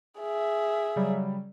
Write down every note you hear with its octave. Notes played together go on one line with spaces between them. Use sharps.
G#4 E5
C#3 F#3 G3